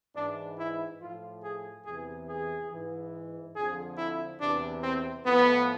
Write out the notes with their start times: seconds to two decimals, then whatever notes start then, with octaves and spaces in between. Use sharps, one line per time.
0.16 G#2 E3 D4
0.59 E4
1.01 A2 F3 F4
1.43 G#4
1.85 E2 C3 E3 G#4
2.28 G#4
2.72 G#2 E3
3.56 F2 D3 F3 G#4
3.98 E4
4.41 E2 C3 E3 D4
4.83 C4
5.26 A2 F3 B3